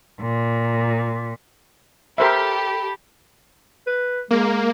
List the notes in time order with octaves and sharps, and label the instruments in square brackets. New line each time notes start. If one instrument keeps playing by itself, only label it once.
[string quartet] A#2
[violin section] G4 A4 [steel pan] A#4 C5 E5 [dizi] B5
[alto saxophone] B4
[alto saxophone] G#3 [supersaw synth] A#3